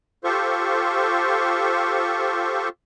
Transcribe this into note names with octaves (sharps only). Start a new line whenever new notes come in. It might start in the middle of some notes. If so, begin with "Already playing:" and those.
F4 G4 A4 C5 C#6